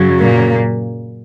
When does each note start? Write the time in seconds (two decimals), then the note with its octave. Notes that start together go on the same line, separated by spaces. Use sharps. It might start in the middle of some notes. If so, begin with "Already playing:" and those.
Already playing: F#2 C#3 F#3
0.20 A#2 A#3